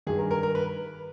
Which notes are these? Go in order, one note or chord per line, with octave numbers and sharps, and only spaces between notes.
G2 D#3 G#4
A#4
A#4
A#4
B4